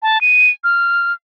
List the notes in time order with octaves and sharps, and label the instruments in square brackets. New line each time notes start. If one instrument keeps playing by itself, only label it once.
[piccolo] A5
D#7
F6